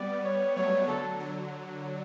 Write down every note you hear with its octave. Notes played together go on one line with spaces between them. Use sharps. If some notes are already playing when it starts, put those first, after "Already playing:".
Already playing: G3 B3 D5
C#5
F#3 A3 C#5
D3 F#3 A4
D3 F#3